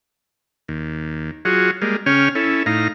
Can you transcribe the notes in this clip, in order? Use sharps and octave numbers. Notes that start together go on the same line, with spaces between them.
D#2
F#3 F4 F#4 G#4
G3 G#3 A#3
C#3 C#4 C#5 G5 F6
C#4 E4 A4
A2 D#4 F5 A#5